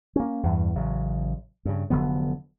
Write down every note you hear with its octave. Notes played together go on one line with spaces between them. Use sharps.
A#3 C#4
E2 G2
A1 C#3 F#3
G2 C#3
F1 D3 F#3 B3